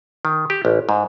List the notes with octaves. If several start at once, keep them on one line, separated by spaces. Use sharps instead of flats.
D#3
G4
A1
G#2